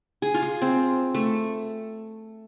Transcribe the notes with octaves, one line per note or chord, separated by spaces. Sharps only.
G#4
F4
G#4
C4
A3